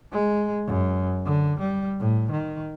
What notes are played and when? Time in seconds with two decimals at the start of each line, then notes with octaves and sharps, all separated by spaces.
0.12 G#3
0.67 F#2
1.25 D3
1.59 G3
2.00 A2
2.31 D#3